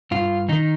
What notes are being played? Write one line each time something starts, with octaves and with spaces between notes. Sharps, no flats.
G2 F4
D#3 D#4